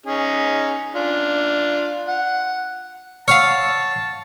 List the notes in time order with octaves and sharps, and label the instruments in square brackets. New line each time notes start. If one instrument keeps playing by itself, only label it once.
[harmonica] C#4 D#4 G#4
D4 F4
F#5
[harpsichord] C#5 [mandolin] F5 E6 F6 [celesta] F#5 C#7 [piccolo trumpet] A5